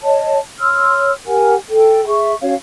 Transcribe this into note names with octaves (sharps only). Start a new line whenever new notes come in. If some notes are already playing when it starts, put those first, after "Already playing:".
C#5 D#5 A5
C#5 C6 E6 F6
G4 A#4 F#5 G#5
A4 G5
G#4 E5 C#6
C#4 F#4 C#5 F5